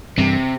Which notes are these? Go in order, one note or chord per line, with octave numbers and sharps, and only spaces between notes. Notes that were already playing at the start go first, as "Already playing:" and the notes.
G2 C3 E3 G3